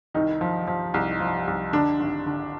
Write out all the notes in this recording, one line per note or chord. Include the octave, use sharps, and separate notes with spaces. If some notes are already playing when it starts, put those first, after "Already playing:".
C2 D#3 D#4
F3
F3
C2
F3
C2
D3 D4
G#1
D3